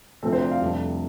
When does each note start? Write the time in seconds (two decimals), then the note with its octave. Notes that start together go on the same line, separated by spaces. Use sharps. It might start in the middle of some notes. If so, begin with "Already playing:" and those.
0.22 D2 C3 F3 C4 A4
0.32 C5
0.42 D5
0.52 F5
0.61 F1 F2 C3 G3 D4